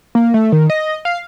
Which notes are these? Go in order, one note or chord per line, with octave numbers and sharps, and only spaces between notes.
A#3
A3
D#3
D#5
F5